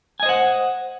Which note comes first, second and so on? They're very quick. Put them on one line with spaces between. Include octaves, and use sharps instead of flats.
G#5 D#5 C5 F#5